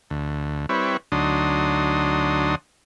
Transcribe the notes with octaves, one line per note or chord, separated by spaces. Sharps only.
D2
G3 C4 E4 B4 C#5
D2 F#3 D4 D#4 C6 D#6